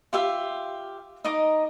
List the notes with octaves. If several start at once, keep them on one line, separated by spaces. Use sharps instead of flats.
F4 G4 E5 F5
D#4 D#5 D6